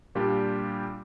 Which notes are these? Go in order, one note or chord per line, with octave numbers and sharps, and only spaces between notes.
A#2 G3 D4 F4 G4